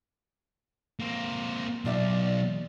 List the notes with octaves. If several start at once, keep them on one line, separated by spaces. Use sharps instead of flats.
A#3 C4
B1 F4 D5 E5